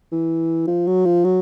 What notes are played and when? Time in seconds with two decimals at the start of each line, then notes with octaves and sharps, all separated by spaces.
0.12 E3
0.67 F3
0.87 F#3
1.05 F3
1.25 F#3